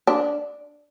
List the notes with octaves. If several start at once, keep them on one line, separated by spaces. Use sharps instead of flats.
D4